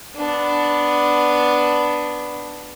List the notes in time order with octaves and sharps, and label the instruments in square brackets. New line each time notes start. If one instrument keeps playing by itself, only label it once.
[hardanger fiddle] B3 D4